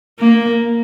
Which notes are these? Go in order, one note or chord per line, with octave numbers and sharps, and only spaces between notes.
A#3